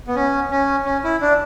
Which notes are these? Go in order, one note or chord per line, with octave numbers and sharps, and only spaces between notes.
B3
C#4
C#4
C#4
E4
D4